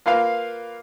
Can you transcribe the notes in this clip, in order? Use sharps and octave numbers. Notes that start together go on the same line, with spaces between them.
A#3 F4 B4 F5